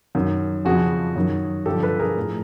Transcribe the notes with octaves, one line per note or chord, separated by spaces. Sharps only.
F#2 D#3
F2 C#3 F3 F#4 G#4
F#2 D#3
G2 D3 F3 G4 A4
A4 B4
G#4 A#4
A2 F3